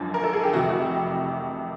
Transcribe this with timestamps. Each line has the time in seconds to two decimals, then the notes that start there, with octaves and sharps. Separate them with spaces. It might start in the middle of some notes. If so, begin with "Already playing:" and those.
Already playing: G#1 F#2 D3 F3
0.14 A#4
0.24 A4
0.33 G#4
0.44 G4
0.53 F1 F2 C3 E3 F#4
0.70 F#4
0.81 G4